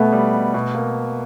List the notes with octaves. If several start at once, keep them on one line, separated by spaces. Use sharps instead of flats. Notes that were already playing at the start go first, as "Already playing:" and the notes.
Already playing: B2 A3 B3
G3
B2
B2
A#3